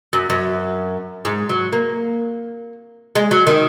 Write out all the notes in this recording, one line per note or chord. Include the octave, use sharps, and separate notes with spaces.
F#2
F#2
G#2
F#3
A#3
G#3
F#3
D#3